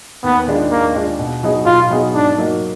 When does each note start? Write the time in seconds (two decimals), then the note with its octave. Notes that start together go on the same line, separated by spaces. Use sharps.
0.24 D#2 B3
0.47 D#3 G#3 D4 F4
0.71 D#2 A#3
0.95 D#3 G#3 D4 F4
1.19 B2
1.43 F#3 B3 D#4 G#4
1.66 B2 F4
1.90 F#3 B3 D#4 G#4
2.14 G#2 D4
2.38 F#3 A#3 D#4